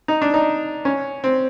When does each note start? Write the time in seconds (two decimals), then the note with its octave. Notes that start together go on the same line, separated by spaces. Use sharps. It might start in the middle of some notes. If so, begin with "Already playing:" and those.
0.08 D#4
0.22 D4
0.34 D#4
0.85 C#4
1.24 C4